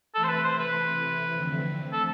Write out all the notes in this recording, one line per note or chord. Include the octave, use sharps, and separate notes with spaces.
C3 E3 A3 E4 A4
C5
B4
C5
B4
F2 D3 A3 C4
A4